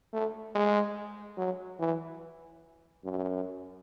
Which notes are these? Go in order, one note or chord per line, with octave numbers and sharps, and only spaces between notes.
A3
G#3
F#3
E3
F#2